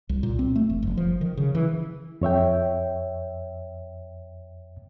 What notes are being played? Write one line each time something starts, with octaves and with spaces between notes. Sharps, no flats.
C2
A#2
C4
A3
F1
F#1
F3
D#3
C#3
E3
F2 C#5 E5 G5